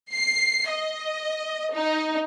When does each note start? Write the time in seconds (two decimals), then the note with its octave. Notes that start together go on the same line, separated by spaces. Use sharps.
0.12 C7
0.70 D#5
1.73 D#4